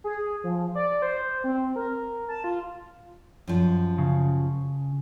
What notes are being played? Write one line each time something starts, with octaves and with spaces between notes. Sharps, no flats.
G#4
F3
D5
C5
C4
A#4
A5
F4
F#2 F3
C#3